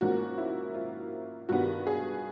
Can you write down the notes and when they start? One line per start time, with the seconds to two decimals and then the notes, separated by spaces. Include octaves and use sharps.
0.01 G#2 F3 A#3 C#4 F#4
0.38 E4
0.74 F4
1.49 G2 D#3 G3 B3 F#4
1.87 G#4